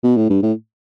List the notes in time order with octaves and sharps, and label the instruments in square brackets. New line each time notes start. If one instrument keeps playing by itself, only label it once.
[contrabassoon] B2
A2
G2
A2